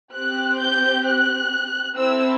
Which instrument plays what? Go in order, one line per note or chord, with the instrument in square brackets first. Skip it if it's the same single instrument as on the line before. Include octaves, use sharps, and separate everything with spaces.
[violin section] C4 G4 F#6
G6
F#6
C4 E4 A4 E6